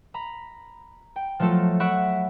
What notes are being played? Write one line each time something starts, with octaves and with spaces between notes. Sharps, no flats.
A#5 B5
G5
F3 F#3 A3 F4 A4
E5 F#5 B5 C#6 F#6 D7